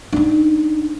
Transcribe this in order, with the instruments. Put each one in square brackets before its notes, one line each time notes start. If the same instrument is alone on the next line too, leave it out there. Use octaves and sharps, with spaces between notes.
[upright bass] D4 D#4